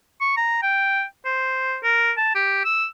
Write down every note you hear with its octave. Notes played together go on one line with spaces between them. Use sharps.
C#6
A#5
G5
C5
A#4
A5
G4
E6